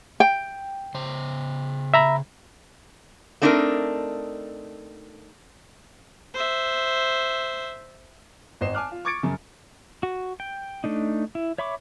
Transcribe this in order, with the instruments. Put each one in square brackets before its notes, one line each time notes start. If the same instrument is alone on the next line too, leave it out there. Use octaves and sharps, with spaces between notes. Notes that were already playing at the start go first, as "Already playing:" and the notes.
[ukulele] G5
[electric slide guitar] C#3 C5
[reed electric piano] E5 A#5 B5
[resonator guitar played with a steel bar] A3 C4 D4 D#4 A4 A#4
[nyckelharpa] C5 E5
[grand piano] G#1 C5 D#5 C7 E7
G#5 A5 D6 F6 F#6
F4
C#6 D6 G#6 A6 C#7 D7
F#2 C#3
[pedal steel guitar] F#4
G5
A3 D4 D#4
E4
C#5 E5 B5 C#6 D6